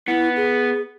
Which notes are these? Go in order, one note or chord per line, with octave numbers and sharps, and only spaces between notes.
B3 E4
G#4